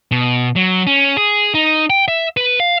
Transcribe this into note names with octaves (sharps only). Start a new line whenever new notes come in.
B2
F#3
C#4
G#4
D#4
G5
E5
B4
F5